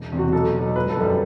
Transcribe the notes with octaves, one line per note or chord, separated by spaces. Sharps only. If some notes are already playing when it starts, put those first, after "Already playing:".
Already playing: E1
E2 C3
F#4
B1 A4
B2 F#3
G1 B4
A4
F#2 D3 G3